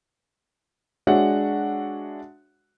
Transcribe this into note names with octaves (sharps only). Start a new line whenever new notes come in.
G#3 D4 F#4 C#5 E5 F#5